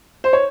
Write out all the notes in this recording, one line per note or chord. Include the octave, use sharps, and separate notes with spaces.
C5
C#5